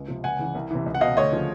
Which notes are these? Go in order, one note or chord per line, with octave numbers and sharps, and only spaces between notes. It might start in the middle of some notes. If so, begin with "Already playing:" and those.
Already playing: C#2
C3 F3
C#2 F#5 G#5
C#3 E3
C2
C3 E3
C#2
F#5
B2 D#5 F5
D2 C#5 D#5
C#3 F3